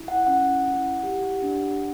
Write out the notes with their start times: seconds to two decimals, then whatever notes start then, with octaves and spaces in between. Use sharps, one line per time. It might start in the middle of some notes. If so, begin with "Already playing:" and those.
Already playing: E4
0.08 F#5
0.27 C#4 F#5
0.65 E4
1.03 G4
1.42 D4